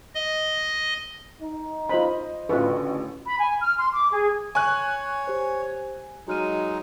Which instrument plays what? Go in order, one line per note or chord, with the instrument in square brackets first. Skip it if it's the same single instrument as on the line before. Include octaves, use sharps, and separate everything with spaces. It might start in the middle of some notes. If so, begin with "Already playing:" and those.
[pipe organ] D#5
[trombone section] D#4
[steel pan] F4 B5 [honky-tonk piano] C5 D#5
[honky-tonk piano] A1 C#6 [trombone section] D2 C#3 [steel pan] F4 B4
[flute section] B5
G#5
F6
C6
D6
G#4
[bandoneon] C#5 [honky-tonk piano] G#5 F#6 [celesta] C#6
[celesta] G4 C5
[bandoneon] F#3 G#3 D#4 [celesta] F#4 F6 D#7